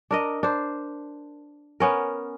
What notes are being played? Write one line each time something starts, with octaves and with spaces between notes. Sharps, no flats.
D4 A#4 D#5
D4 C5
B3 C#4 A#4